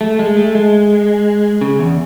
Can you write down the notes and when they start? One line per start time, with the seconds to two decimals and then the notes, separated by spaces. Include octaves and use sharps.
0.01 A3
0.19 G#3
0.37 A3
0.55 G#3
1.61 C#3
1.79 E2